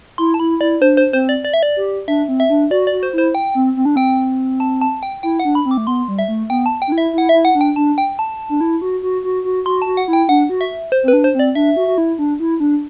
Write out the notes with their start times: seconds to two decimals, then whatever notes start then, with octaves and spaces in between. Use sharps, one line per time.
0.18 E4 C6
0.34 A5
0.40 E4 B5
0.61 E4 D5
0.81 D4 C5
0.97 C5
1.13 C4 C5
1.29 D5
1.45 D5
1.54 E5
1.63 D5
1.76 G4
2.08 D4 E5
2.28 C4
2.40 E5
2.50 D4
2.71 F#4 D5
2.87 D5
2.92 F#4
3.03 C5
3.13 E4 C5
3.35 G5
3.55 C4
3.76 C4
3.85 D4
3.96 C4 G5
4.60 A5
4.81 A5
5.03 G5
5.23 E4 G5
5.40 F#5
5.45 D4
5.55 B5
5.66 C4
5.71 D6
5.77 A3
5.87 B3 C6
6.08 G3
6.19 E5
6.28 A3
6.50 B3 G5
6.66 A5
6.82 G5
6.87 D4
6.92 E4
6.98 E5
7.13 E4 F#5
7.29 E5
7.34 E4
7.45 F#5
7.55 D4
7.61 G5
7.76 D4 A5
7.98 G5
8.19 A5
8.49 D4
8.61 E4
8.82 F#4
9.03 F#4
9.24 F#4
9.45 F#4
9.66 F#4 C6
9.82 A5
9.86 F#4
9.97 F#5
10.08 E4
10.13 G5
10.28 D4 F#5
10.49 F#4
10.61 E5
10.92 C5
11.03 C4 B4
11.13 D4
11.24 C5
11.35 C4 D5
11.55 D4 E5
11.76 F#4
11.87 F#4
11.98 E4
12.19 D4
12.40 E4
12.60 D4